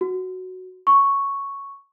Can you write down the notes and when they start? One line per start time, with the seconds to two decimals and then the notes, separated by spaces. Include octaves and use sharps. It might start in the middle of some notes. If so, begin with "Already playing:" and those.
0.01 F#4
0.87 C#6